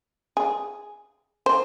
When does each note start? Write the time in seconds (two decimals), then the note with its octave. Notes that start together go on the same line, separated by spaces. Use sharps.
0.37 G#4
1.46 C5